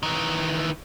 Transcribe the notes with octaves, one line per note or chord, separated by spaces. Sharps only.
D#3 E3